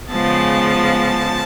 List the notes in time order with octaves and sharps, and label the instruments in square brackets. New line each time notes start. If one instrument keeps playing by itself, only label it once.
[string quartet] C#3 F3 G#3 B3 A5